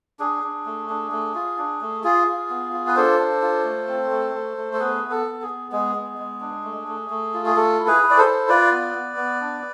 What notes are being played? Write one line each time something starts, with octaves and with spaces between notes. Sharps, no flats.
D4 G#4
D4
A3
D4
A3
F4
D4
A3
F4 G#4
F4
B3
F4
B4
D4 A4 C5
D4
F4
A3
C4
A3
A3
A3
A4
B3 G#4 B4
B3
A4
B3
G#4
B3
G#3 G#4
B3
G#3
D4
A3
A3
A3
F4
G#4
A3 A4
E4
G#4 B4
E4
D5
A4 C5
E4
F4 B4 D5
B3
B3
B3
D4